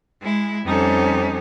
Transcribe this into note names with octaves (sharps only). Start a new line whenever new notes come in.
G#3 E4
F2 G3 C#4 D#4 A4 C5